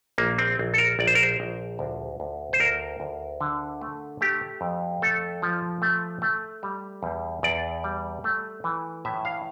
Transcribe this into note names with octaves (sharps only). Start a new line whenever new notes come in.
A#1 A#3
C4
A#1
A4
A#4
A#1 D5
C5
A#4
C5
A#1
D2
D2
C5
D2 A#4
D2
D3
A3
A3 G4
F2
A3 A4
F3
A3
A3
G3
E2
E2 D5
G3
A3
E3
A2 E5
F5